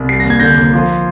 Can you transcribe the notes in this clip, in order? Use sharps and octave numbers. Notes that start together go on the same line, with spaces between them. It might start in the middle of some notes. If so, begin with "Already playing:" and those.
Already playing: C2
G3 C7
D#2 A#6
G#6
D3 G6 A#6
D#2
F3